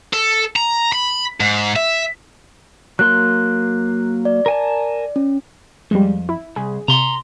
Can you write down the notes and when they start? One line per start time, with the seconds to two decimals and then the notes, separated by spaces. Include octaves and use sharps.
0.13 A4
0.56 A#5
0.92 B5
1.40 G#2
1.76 E5
2.99 F#3 A#3 C6 F#6
4.25 D5
4.46 A#4 G#5 A5
5.16 C#4
5.91 F2 G3 G#3
6.29 E4
6.56 C2 G#4
6.88 C3 A#5 C6